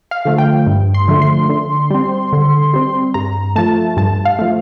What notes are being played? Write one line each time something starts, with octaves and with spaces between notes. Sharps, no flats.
F5
D3 F3 A3
G5
G2
C6
D3 F3 A3
C6
D3
G3 C4
D3
G3 C4
G2 A#5
F3 A3 A5
G2 A5
F5
F3 A3